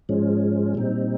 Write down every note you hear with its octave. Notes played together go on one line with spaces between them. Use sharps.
G#2 F3 G#3 C#4
A#2 G3 C4 D#4